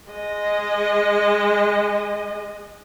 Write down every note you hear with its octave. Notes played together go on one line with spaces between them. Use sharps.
G#3 D#5